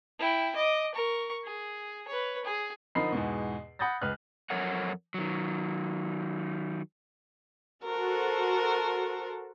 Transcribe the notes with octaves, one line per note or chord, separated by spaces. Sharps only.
E4 G5
D#5 D6
A#4 C#6
G#4
B4 C#5
G#4
D3 F3 D#4 A#4 B5 C7
E2 G#2 B2
F#5 B5 D#6 G6 A6 A#6
C#2 B4 F6 F#6
F2 F#3 A4 A#4 C#5 F#5
D#3 F#3
F#4 A4 A#4 C5